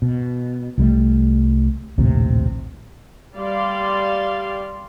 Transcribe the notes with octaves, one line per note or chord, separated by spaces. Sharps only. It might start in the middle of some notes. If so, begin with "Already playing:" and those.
B2
C2 G3 A3
A#1 D#2 A2 C3
G3 D5 F5 C6